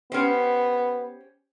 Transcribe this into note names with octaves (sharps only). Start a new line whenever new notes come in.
B3 C#4 G4 C5